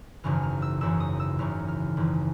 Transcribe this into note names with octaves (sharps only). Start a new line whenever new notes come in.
G#1 F#2 C#3 E3 F6
F6
E6
G#1 F#2 C#3 E3 E6
D#6
E6
G#1 F#2 C#3 E3 F6
F6
G#1 F#2 C#3 E3